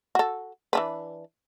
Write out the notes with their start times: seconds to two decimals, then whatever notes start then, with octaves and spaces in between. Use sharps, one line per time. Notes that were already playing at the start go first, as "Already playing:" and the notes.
0.15 F#4 A4
0.73 E3 D4 B4